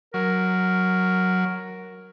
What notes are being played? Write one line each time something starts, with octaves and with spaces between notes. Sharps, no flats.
F#3 A#4